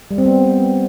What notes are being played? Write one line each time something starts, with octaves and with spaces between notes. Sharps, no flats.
G3
C4
B3